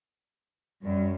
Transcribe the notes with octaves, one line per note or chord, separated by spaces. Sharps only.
F#2 G3